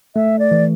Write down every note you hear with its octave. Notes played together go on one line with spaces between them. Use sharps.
A3 E5
D5
E3